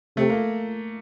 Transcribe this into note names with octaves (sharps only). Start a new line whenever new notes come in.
C3 A3
A#3